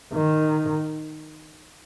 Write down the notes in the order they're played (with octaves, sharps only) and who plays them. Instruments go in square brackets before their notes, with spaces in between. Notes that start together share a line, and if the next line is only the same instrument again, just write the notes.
[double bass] D#3